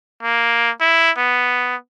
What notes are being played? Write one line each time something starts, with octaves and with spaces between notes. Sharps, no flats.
A#3
E4
B3